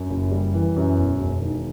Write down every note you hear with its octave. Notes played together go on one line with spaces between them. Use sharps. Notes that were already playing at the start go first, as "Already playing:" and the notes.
Already playing: F#2
F#1
G3
E3
F#2
E1
E1
D#3